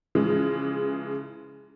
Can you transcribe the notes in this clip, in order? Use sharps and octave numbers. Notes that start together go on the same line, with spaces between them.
C#3 E3 F3 G#3